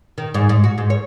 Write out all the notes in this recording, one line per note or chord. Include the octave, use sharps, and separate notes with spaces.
D#3
G#2
G#2
F#4
G#2
C#5